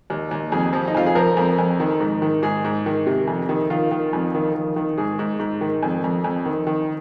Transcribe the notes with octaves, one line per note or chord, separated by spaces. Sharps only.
D#2
D#2
F2 G#4
F3
D#4
F2 F4
G#4
F3 A#4
F2
F2
D#3
G#2
D#3
G#2 G#4
G#2
D#3
C3
F2
D#3
D#3 F4
D#3
F2
D#3
D#3
D#3
G#2 G#4
G#2
G#2
D#3
F2
F2
F2
D#3
D#3